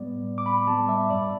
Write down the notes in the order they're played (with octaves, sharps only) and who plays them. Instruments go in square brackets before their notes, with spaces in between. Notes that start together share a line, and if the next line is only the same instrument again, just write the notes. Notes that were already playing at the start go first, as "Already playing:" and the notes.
Already playing: [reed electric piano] A2 G3 B3 D5
A2
D6
B5
G3 B3 A5
E5
G2 D5